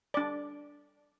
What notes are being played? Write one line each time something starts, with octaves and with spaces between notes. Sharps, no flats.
D4 D5